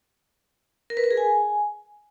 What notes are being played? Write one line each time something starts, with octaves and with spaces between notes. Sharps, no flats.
A#4
B4
A#4
G#4
G#5